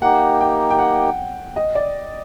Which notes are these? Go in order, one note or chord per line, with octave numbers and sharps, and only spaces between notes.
A#3 D#4 G4 F#5
G5
G5
F#5
D#5
D5